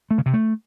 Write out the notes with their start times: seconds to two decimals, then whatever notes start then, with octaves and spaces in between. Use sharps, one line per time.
0.11 A3
0.18 C#3
0.26 C3
0.34 A3